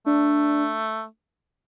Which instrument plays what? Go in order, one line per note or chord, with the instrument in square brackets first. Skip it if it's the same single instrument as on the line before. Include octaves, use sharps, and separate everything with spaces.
[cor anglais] A3 [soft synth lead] D4